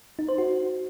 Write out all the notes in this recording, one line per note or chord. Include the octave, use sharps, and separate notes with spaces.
D#4
C5
F#4